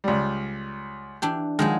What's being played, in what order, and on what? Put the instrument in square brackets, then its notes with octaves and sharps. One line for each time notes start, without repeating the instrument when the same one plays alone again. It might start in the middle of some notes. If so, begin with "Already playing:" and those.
[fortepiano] C#2 G3
[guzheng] E3 D4 G4
[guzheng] D#3 F3 F#3 [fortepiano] G#3